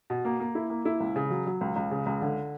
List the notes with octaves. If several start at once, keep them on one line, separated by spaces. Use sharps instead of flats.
B2
A#3
A#3
E4
A#3
E4
C#2
C#3
F#3
F#3
C#2
C#2
C#3
C#2
D3